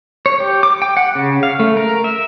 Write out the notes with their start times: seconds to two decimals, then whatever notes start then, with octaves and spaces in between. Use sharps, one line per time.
0.26 C#5
0.40 G4
0.63 D6
0.82 G5
0.97 F#5
1.15 C#3
1.43 F5
1.60 A3
1.77 A#4
2.04 E5